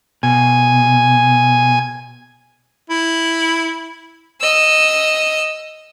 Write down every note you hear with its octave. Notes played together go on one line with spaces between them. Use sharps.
B2 G#5
E4
D#5 E6